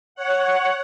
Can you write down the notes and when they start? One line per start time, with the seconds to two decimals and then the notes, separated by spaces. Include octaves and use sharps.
0.15 C#5 F#5